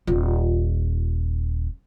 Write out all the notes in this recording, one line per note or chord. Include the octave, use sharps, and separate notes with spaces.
D#1 F4